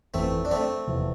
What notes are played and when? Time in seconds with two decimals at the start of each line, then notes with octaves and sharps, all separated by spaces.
0.14 G1 F2 E3 A3 C4
0.45 D4
0.51 A3 C4
0.87 F1 E2 C3 F3